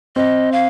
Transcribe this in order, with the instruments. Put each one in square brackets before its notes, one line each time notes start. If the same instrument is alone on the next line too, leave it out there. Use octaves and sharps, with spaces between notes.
[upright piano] C4 [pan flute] D#5
[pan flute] F5